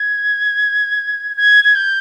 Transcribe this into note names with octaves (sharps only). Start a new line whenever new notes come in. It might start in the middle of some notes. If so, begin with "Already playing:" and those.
Already playing: G#6
G#6
G#6
G6